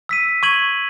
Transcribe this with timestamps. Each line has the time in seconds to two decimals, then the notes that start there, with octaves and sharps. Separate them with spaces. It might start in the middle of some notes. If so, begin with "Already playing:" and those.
0.09 E6 B6 D#7
0.43 C#6 G#6 D#7 F#7